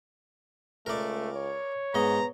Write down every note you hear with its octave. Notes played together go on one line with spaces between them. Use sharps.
C#2 A3 A#4 D5
C#5
G#2 B3 D#5 A#5